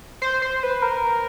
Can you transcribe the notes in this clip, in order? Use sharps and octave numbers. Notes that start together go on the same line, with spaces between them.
C5
C5
B4
A#4